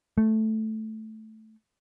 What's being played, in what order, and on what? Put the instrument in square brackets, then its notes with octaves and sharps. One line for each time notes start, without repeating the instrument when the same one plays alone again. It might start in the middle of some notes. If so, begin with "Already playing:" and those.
[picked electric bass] A3